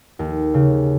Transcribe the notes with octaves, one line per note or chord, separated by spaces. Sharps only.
D#2
C#3